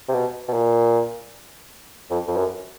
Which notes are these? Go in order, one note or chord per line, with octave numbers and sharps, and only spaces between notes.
C3
B2
B2
A#2
F2
F2
F#2